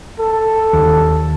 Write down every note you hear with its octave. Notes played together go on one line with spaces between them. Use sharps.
A4
D#2